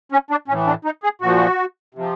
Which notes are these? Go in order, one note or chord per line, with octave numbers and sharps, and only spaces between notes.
C#4
D4
A2 E3 C#4
D4
D#4
G#4
A#2 F3 F#4
C3 F3